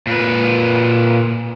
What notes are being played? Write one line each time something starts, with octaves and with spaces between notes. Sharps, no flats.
A#2 B4